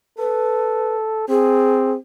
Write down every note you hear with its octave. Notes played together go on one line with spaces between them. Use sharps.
A4 B4
C4 G#4